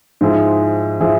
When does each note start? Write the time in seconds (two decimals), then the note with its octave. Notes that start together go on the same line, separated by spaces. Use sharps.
0.21 G#2 F3 G#3 E4 G#4
1.00 F3 G#3 E4 G#4